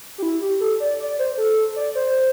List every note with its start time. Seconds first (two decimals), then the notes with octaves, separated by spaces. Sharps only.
0.18 G4
0.23 E4
0.42 G4
0.60 A4
0.80 D5
0.99 D5
1.19 C5
1.38 A4
1.76 D5
1.95 C5